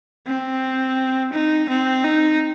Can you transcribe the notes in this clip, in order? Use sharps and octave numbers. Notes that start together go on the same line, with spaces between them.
C4
D#4
C4
D#4